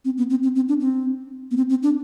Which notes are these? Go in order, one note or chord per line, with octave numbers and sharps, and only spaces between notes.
C4
B3
C4
C4
C4
D4
C4
B3
C4
C4
D4